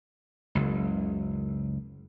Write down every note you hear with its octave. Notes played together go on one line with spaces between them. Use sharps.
F#1 C#2